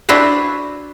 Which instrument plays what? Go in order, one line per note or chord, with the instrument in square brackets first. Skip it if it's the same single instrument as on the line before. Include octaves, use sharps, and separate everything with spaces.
[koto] D4 E4 F#4 B4 C5